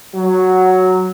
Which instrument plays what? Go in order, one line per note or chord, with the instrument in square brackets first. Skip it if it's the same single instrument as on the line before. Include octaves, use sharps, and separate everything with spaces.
[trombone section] F#3